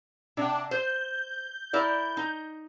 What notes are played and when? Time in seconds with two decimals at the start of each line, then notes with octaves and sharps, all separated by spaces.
0.37 C3 D4 G5
0.71 C5 G6
1.73 E4 A#4 D5
2.17 D#4